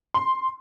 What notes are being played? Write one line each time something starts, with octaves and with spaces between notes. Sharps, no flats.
C6